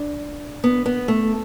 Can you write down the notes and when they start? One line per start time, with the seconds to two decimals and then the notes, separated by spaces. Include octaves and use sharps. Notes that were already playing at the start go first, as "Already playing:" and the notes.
Already playing: D4
0.64 B3
0.86 B3
1.08 A3